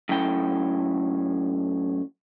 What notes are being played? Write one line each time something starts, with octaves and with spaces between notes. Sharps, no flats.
F#2 A2 G5